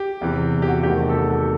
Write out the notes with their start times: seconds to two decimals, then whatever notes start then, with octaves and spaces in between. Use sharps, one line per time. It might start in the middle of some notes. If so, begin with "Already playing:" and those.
Already playing: G4
0.21 E2 C3 E3
0.62 G4
0.68 F#4
0.83 E2 C3 D#3 A3 G4
1.09 A4
1.14 G4
1.29 F#4 A4